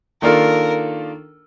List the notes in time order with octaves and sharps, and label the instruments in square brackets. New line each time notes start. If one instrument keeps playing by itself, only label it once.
[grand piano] D#3 A#3 D4 F4 A4 [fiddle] A#4